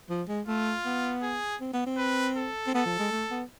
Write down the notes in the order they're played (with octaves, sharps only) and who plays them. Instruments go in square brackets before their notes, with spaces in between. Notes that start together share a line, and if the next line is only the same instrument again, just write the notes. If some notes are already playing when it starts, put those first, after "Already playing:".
[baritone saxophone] F3
G#3
[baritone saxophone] A3 [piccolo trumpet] F4
[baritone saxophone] B3
[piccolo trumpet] G#4
[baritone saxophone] C4
B3
C4
[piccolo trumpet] B4
A4
[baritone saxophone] C4
[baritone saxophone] B3 [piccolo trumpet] A4
[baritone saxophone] F3
G#3
A3
B3